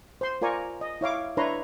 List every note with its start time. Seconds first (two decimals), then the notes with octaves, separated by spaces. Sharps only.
0.21 C5 C6
0.42 F4 A#4 D5 G#5 A#5 C#6
0.81 D#5
1.01 E4 C#5 F5 D6
1.37 D4 E4 B4 C#5 A#5 C6